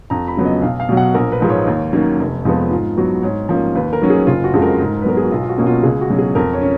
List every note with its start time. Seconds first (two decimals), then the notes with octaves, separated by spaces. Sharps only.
0.10 F2 A#5
0.28 B5
0.37 C#3 F#3 B3
0.45 D#5
0.62 B1 F5
0.80 F5
0.89 B2 F#3
0.97 F#5
1.14 A#1 A#4
1.32 B4
1.41 G#2 F3 G#3
1.50 C#5
1.67 D#2
1.93 D#3 F#3 A#3 C#4
2.19 F1
2.45 F2 F3 G#3 B3
2.71 G#2 F4
2.97 F#3 B3 F#4
3.23 G#2 C#5
3.49 F3 A#3 C#4
3.75 D#2 B4
3.93 A#4
4.02 D#3 F#3 C#4
4.10 G#4
4.27 F#1 F4
4.44 F#4
4.53 F2 C#3 G#3
4.62 A#4
4.80 G#2
5.02 B4
5.05 F#3 B3 A#4
5.17 G#4
5.24 F#4
5.31 B1 F4
5.43 F4
5.49 F#4
5.57 B2 A#3 C#4
5.66 F4
5.83 C#2 G#4
6.01 F#4
6.10 B2 F#3 C#4
6.18 G#4
6.35 F2 A#4
6.53 C#5
6.61 C#4